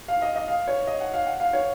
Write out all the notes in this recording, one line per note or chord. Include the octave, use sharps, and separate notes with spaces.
F5
D#5
D#5
F5
C#5
D#5
F#5
F5
F#5
F5
C#5